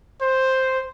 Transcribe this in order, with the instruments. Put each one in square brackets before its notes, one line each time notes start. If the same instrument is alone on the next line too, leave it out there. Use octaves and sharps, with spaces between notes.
[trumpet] C5